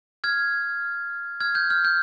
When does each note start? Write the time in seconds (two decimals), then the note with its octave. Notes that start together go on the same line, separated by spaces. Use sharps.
0.24 F6 G#6
1.40 F6 G#6
1.55 G6
1.70 F6
1.85 G6